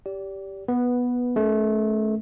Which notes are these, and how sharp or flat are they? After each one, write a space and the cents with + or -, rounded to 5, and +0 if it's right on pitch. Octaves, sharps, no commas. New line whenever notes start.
G4 -5 D5 -30
B3 -10 B4 +0
A3 -30 C#4 +0 A#4 +0